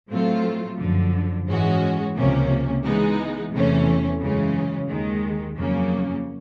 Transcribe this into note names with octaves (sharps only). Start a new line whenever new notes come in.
A2 F#3 A3 C4 F4
F#2 D3 F3
G#2 E3 G#3 C#4 F#4
C#2 C3 F3 A#3 C#4
E3 G#3 B3 D#4
E2 C3 E3 A3 C#4
F#2 C#3 E3 G#3 C#4
D#2 D#3 G#3
F2 C#3 F#3 A#3 C#4